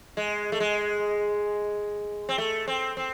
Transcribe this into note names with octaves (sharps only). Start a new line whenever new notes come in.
G#3
A3
G#3
C4
A3
C4
C4